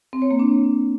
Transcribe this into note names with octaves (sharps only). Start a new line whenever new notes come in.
C4
C#5
A#3
D4